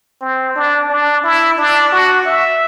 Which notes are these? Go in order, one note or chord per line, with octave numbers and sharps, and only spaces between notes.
C4
D4
D4
E4
D4
F#4
E5